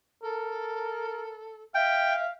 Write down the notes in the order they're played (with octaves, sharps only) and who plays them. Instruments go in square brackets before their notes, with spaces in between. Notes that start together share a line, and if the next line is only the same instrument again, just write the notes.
[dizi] A4 [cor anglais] A#4
[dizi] E5 [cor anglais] F5 [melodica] G5